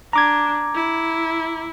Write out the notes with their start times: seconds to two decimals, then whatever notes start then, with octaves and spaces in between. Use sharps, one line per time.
0.13 D4 A#5 D6 G#6
0.74 E4